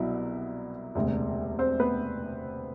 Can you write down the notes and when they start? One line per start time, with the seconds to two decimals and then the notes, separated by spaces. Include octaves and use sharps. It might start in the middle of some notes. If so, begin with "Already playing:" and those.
Already playing: C2 B2 F#3 E4
0.95 E1 D2 C3
1.59 C4 C5
1.80 B3 B4